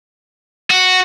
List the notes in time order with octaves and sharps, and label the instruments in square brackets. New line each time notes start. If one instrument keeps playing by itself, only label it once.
[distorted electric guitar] F#4